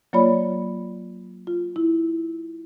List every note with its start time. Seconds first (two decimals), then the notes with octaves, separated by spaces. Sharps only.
0.13 F#3 A#3 F4 C#5 D5 B5
1.47 F4
1.76 E4